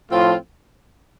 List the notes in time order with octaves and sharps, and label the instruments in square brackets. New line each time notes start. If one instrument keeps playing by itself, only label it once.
[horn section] A2 F3 C4 F4